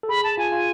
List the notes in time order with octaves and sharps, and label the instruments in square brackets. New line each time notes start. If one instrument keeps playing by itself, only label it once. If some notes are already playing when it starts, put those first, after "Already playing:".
[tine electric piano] A4
[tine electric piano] G#4 [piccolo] B5
[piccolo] A5
[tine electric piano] F4 [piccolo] G#5
[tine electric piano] F4